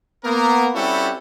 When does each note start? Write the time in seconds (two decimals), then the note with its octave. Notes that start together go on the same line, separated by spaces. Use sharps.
0.24 A#3 B3 A#4
0.75 G3 C4 C#4 E4 F#4 A4